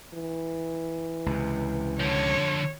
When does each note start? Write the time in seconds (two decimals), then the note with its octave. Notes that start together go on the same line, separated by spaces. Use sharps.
0.14 E3
1.26 C#2 C3
2.00 D3 F3 C#5